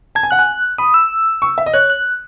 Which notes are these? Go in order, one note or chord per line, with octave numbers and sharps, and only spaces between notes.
A5 G#6
G#5
F#5 F#6
G#5
B5 D#6
E6
C#6
E5
D#5
C#5 F#6
F#6